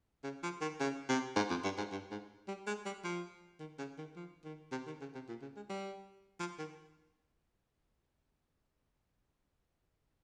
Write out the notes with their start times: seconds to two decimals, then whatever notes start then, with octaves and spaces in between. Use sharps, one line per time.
0.24 C#3
0.43 F3
0.61 D#3
0.80 C#3
1.09 C3
1.36 G#2
1.50 F2
1.64 G2
1.78 G#2
1.92 G2
2.11 G#2
2.48 G3
2.67 G#3
2.85 G3
3.04 F3
3.60 D#3
3.78 C#3
3.98 D#3
4.16 F3
4.45 D#3
4.72 C3
4.87 D#3
5.01 C#3
5.15 C3
5.29 A#2
5.42 C#3
5.56 G#3
5.70 G3
6.40 F3
6.59 D#3